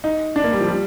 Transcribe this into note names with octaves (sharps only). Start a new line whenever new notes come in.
D#4
D4
A#3
G3
F3
G3